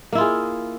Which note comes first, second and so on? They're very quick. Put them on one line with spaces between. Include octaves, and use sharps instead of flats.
A#3 E4 F4 G#4